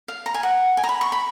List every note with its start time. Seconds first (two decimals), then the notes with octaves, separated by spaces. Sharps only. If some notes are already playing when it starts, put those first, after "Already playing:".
0.08 F5
0.26 A#5
0.34 G#5
0.43 F#5
0.77 G#5
0.84 A#5
0.89 B5
1.01 C#6
1.12 B5